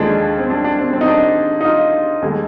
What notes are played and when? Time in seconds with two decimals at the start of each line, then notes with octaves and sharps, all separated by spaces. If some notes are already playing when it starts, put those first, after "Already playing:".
Already playing: D#2 D3 F3 G#3 D4
0.39 C4
0.50 D4
0.64 D4
0.79 C4
0.93 C4
1.01 D#4
1.07 D4
1.61 D#4
1.65 F4
2.22 D#2 D3 G#3